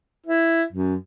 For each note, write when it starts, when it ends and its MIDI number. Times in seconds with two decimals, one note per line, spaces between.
0.26 0.63 64
0.72 0.95 42